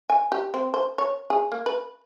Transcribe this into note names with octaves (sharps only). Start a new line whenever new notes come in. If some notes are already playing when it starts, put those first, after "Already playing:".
G#5
G4
C4
C5
C#5
G#4
A#3
B4